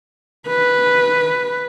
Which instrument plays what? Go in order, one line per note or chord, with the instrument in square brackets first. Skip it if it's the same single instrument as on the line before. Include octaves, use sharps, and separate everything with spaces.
[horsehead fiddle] B4